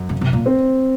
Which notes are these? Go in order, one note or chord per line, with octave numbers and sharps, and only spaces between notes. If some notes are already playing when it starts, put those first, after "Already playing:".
Already playing: F#2
C#3
C3
A#2
C4